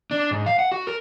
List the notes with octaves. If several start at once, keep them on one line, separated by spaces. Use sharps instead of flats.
D4
G#2
F5
F#5
F#4
A#4